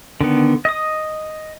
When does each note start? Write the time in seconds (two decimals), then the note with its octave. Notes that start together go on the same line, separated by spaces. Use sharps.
0.21 D3 D#3 B3
0.65 D#5 D#6